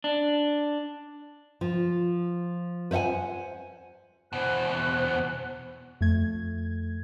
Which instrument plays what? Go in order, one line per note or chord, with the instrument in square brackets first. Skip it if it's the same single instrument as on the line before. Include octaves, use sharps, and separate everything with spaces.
[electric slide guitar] D4
[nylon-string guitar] F3
B4 C5 E5 F#5 G#5
[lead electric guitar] E2 B2 [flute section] C5 F#6
[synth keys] F2 A3 G#6